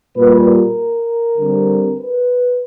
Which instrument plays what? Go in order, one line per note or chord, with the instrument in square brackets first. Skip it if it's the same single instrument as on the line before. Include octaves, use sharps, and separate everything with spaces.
[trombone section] A#2 G3 A#3 B4
A#4
D3 G3 C4
B4